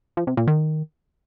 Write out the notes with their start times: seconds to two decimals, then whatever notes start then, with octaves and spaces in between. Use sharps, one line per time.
0.17 F3
0.27 C3
0.37 A#2
0.47 D#3